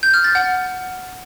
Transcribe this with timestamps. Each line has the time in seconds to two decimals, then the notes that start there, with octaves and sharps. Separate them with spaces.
0.03 G6
0.14 F6
0.24 A6
0.35 F#5